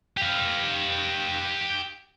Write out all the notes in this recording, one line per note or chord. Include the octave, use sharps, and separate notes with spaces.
G4 F5